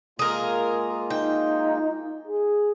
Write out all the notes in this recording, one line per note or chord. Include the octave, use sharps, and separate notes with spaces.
G#3 A#3 F4 G#4 A#4
D#4 G5
G#4